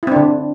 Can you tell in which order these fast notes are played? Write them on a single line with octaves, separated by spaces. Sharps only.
E4 C4 D4 D3